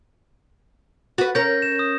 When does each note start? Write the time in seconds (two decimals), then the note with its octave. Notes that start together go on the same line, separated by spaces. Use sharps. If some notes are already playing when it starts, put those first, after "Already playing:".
1.18 F#4 B4 A6
1.35 C#4 A#4 G6 A#6
1.62 E7
1.79 D#6